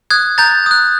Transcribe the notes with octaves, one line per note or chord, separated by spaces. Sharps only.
D#6 F#6 G#6
A#5 G6 A6
D#6 F#6